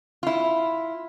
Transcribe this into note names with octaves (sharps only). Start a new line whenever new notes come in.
E4 F4